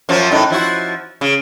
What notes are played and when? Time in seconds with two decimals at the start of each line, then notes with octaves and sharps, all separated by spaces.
0.09 F#2 F3 F#3
0.31 F#2 A2 D#4
0.50 F3 E4 F#4
1.21 C#3